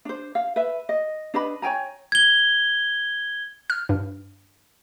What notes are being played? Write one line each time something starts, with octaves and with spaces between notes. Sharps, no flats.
D4 C5
F5
B4 E5
D#5
D4 B4 D#5 B5
C#5 G5 G#5 A#5
G#6 G7
F6
G2